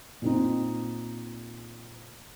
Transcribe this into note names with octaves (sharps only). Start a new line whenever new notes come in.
A#2 C4 D#4